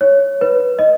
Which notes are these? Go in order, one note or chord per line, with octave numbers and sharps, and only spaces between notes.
C#5
B4
D#5